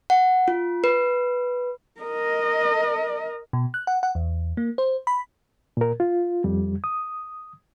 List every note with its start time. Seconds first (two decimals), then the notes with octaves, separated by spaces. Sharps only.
0.10 F#5
0.48 F4
0.84 B4
2.00 A#4 D#5
3.53 B2
3.74 F#6
3.87 F#5
4.03 F#5
4.15 E2
4.57 A#3
4.78 C5
5.07 B5
5.77 A#2 A#4
6.00 F4
6.44 F2 G3
6.84 D#6